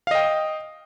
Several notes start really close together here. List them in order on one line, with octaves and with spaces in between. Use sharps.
F5 D#5 G5